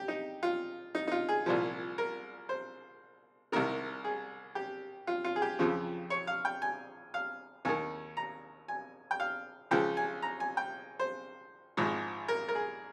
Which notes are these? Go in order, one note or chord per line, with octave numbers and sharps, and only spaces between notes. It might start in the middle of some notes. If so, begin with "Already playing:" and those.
Already playing: G4
D#4
F4
D#4
D#4
F4
G#4
C2 A#2 F3
A#4
C5
C2 C3 D#3 A#4
G#4
G4
F4
F4
G#4
G4
F2 C#3 F3
C#5
F5
G5
G#5
F5
D#2 D#3 G#5
A#5
G#5
G5
F5
C#2 C#3 F3 G5
G#5
A#5
G#5
G5
C5
G#1 G#2 F3
A#4
A#4
G#4